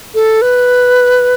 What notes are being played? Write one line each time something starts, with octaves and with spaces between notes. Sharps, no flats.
A4
B4